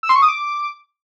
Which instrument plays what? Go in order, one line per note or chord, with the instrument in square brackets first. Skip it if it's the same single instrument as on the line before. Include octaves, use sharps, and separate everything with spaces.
[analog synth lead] E6
C6
C#6
D#6
D6